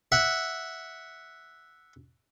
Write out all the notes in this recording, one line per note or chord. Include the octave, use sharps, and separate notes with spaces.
E5 F#5